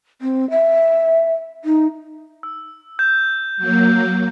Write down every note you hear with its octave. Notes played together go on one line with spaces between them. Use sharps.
C4
E5
D#4
E6
G6
F#3 A#3